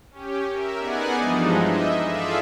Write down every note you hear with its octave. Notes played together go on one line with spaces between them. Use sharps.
C#4 G4
A#4 E5
B3 D#4 G#4 D5 F#5 G#5
G2 E3 F3 G#3 D4 D#4
D#5 E5
F4 G#4 A4 D5 E5 F5